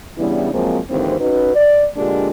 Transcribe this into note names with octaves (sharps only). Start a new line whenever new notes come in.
C#3 E3 G3 B3 D4 E4
F3 F#3 G#3 A#3 C4
D#2 G#2 D3 E3 C4
C#4 D#4 F#4 B4
D5
A#2 D3 G#3 D4 F4 G4